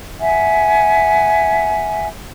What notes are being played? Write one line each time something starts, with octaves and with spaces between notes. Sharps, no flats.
E5 F#5 G#5